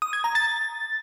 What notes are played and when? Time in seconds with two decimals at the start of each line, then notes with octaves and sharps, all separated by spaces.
0.02 D#6
0.13 G#6
0.24 A#5
0.35 A6